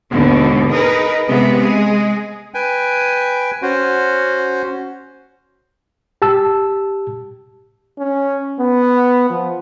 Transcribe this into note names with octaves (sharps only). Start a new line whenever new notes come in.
D#2 G#2 B2 D3
D#4 G#4 A#4 B4
C3 G#3 B3
G#3 G#4
B4 G5 G#5
C#4 F#4 C5
G4 A5 E6
C#4
B3
F3